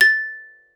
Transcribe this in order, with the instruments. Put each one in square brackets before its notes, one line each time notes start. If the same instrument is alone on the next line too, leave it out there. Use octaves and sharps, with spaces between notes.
[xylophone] A6